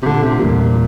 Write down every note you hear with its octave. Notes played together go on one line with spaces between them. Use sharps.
C3
A#2 D3 A3 C4 F4 A4
C3
E2 A#2 E3 G3